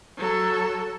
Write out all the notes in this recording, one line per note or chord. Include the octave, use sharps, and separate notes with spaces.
F#3 A4